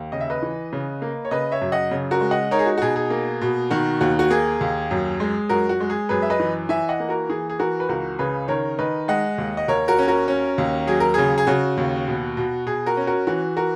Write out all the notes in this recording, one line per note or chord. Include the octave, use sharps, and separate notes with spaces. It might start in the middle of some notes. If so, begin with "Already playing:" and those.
Already playing: D#2
C#3 D#5
E5
B4 D#5
E3
C#3
A#3
C#5
C#3 B4 D#5
C#5 E5
F#2
D#5 F#5
C#3
F#4 A#4
G#3
D#5 F#5
D#4 A#4 C#5
G#4
F#4
F#4
B2 G#4
G#4
A#3
B2
D#3 F#4
D#2 F#4
F#4
A#3 G#4
D#2
F#2
G#3
F#2 F#4 A#4
F#4
G#3
G#4
F#2 G#4 B4
E5
B4 D#5
E3
E3 E5 G#5
D#5 F#5
A#3
F#4 A#4
E3 G#4
G#4
E3 F#4 A#4
B4
C#2 F#4 A#4
C#3 G#4 B4
D#3 A#4 C#5
D#3 B4 D#5
G#3 D#5 F#5
D#2
D#5
D#2 A#4 C#5
F#4 A#4
C#4
F#4 A#4
C#4
D#2
F#3 G#4
A#4
C#3 G#4
G#4
C#3 F#4
D#2
B2
B2
B2 G#4
F#4 A#4
C#4
F#4 A#4
E3 F#4
F#4 A#4